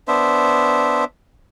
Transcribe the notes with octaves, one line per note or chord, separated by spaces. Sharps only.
B3 D4 C5 E5